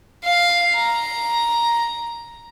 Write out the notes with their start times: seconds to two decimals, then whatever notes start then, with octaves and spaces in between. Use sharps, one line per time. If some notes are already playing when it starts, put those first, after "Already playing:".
0.24 F5
0.74 A#5